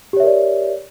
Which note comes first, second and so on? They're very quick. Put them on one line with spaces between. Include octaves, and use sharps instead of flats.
G4 C#5 E5 A#4 D5